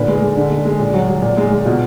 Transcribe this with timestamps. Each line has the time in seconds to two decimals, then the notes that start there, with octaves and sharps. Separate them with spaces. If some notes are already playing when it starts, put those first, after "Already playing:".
Already playing: A#2 D3 B4
0.08 G#3
0.22 G#3
0.36 D3
0.51 G#3
0.65 G#3
0.79 A#2
0.94 F#3
1.09 F#3
1.22 A#2
1.37 G#3
1.51 G#3
1.65 B2 F4